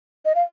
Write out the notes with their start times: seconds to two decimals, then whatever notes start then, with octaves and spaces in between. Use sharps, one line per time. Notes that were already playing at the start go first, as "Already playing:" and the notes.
0.25 D#5
0.35 F5